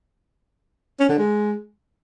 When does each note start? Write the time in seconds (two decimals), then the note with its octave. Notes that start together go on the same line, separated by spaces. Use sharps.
1.00 C#4
1.09 D3
1.18 G#3